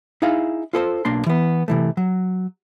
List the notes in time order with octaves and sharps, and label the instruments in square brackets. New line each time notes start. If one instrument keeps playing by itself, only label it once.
[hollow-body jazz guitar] D#4 E4 G#4 F5
F4 A4 B4 C5
B1 A#3 D4 C6
E3 B3
C3 E3 A3
F#3